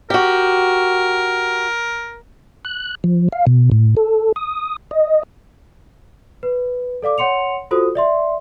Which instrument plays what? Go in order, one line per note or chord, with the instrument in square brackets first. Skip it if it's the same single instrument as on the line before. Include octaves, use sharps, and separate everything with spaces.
[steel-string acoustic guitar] F#4 G4 [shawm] A#4
[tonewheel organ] F#6
F3
F5
B2
A2
A4
D#6
D#5
[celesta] B4
A4 D5 F5 D6
C#5 F#5 C6 C#7 F7
F4 F#4 A4 C5 D#6
D5 E5 C6